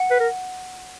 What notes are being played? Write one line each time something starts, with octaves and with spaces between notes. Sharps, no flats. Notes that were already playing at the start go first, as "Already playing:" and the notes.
Already playing: F#5
B4
A#4